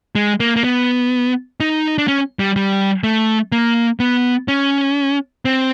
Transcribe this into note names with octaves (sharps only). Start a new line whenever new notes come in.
G#3
A#3
A#3
B3
D#4
D4
C#4
G3
G3
A3
A#3
B3
C#4
C4